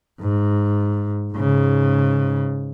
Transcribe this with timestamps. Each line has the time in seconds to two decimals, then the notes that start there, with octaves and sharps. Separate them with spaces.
0.20 G#2
1.33 G#2 C#3